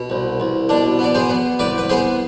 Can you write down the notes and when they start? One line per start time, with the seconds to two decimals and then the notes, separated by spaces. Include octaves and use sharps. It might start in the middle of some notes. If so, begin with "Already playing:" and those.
Already playing: B2
0.10 C2
0.40 C2
0.69 B2 D4
0.99 B3
1.04 D5
1.15 G#4 C5
1.29 B3
1.59 C2 B4 D5
1.78 B4
1.89 B3 G#4 C5